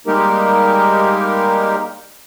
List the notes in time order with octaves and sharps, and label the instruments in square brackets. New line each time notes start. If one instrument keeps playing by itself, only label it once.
[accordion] G3 G#3 A#3 D#4 G4 A#4